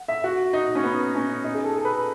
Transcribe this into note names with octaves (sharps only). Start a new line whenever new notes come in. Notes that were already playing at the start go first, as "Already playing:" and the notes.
Already playing: F#5
E5
F#4
D#4
C#4
B3
C#4
D#4
G#4
A4
A4
B4